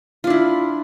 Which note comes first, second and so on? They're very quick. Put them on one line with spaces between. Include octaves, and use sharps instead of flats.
F4 D4 E4